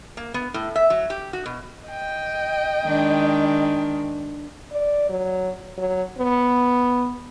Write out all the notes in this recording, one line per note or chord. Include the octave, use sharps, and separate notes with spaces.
A#3
B3
A2
E5
F#3
G4
F#4
B2
D#5 G5
D#3 G#3 D4
D5
F#3
F#3
B3